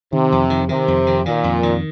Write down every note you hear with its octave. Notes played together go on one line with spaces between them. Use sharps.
C3 D#3
F2
D#3
C3 D#3
F2
D#3
A#2 D#3
F2
D#3